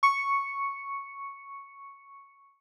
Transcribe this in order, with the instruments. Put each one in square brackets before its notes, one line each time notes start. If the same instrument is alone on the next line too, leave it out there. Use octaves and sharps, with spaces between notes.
[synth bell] C#6 C#7